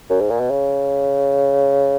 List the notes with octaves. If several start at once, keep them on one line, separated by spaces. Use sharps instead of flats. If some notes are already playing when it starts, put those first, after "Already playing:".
F#2
G#2
A#2
B2
C#3